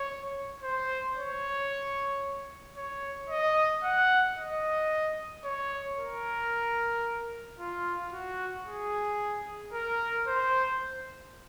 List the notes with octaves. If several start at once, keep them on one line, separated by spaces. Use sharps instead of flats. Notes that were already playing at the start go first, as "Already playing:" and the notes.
Already playing: C#5
C5
C#5
C#5
D#5
F#5
D#5
C#5
A#4
F4
F#4
G#4
A#4
C5